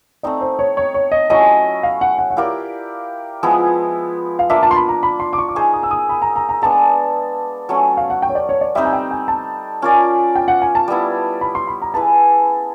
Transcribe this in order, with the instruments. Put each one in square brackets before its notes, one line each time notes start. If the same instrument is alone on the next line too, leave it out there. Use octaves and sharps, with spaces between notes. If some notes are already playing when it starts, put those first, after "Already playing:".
[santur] A3 C4 D#4 [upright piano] D5
[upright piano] C5
C#5
C#5
C#5
D#5
[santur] F#3 A3 C#4 E4 [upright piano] D#5
[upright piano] F5
F#5
F#5
F#5
[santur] E4 G4 A#4 D5 [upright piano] F5
[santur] F3 G#3 B3 E4
[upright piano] F5
[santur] A#3 D4 F4 [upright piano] E5
[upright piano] A5
C6
B5
A#5
B5
C6
D6
C#6
D6
[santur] D#4 G#4 C5 [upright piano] C#6
[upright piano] D#6
E6
D#6
B5
A#5
A#5
A#5
[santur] G#3 B3 D4 [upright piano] A5
[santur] F#3 A3 C#4
[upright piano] F5
F#5
G5
C#5
D5
C#5
D5
[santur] G3 C4 D#4 [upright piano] E5
[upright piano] G#5
G5
G#5
A5
[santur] C#4 F4 A#4 D5
[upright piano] G5
F#5
G#5
A5
[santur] G3 B3 E4
[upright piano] B5
C6
B5
A#5
[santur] E4 G#4 B4 [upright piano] A5